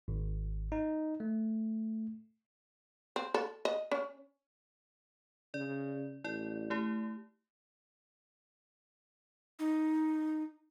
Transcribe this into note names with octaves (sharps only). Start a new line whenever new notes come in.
G#1
D#4
A3
C4
A4
D#5
C#4
C#3 D5
A1 E4 D5
A3 E4 G4
D#4